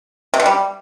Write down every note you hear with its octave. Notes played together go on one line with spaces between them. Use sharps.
C3
B2
G3